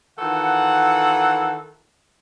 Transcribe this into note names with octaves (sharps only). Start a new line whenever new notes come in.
D#3 E3 F4 A4 F#5